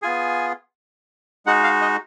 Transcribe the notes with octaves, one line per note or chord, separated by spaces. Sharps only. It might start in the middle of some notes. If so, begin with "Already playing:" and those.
B3 F4 G#4 G#5
G#3 D#4 F#4 F#5
F5
D#5